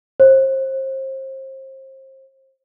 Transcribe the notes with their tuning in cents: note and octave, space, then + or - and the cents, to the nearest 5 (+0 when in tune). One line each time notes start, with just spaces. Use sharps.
C5 +30